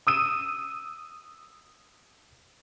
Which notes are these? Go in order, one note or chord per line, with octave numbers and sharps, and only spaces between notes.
D#6 E6 D#7